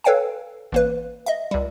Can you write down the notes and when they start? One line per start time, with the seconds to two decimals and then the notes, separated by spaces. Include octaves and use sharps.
0.04 A4 B4 C#5 F5 G5 G#5
0.72 A1 A#3 B4
1.26 D#5 E5
1.51 C#2 G3